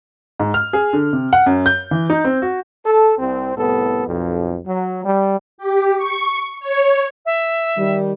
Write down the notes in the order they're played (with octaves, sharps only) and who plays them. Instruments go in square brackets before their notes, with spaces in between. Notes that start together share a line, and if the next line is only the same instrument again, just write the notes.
[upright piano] G#2
F6
G#4
D3
C3
F#5
F#2
G6
E3
D#4
C4
F#4
[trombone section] A4
C2 C4
C2 A2 B3 A4
B1 F2
F#3
G3
[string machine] G4
C#6
C#5
[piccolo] E5
[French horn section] D#3 G3